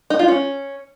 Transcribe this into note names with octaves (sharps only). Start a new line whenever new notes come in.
D#4
F4
C#4